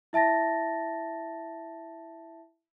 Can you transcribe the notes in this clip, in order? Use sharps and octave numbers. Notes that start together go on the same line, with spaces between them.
E4 E5 A5 A6 A#6